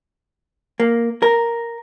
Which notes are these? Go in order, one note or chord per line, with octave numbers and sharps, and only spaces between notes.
A#3
A#4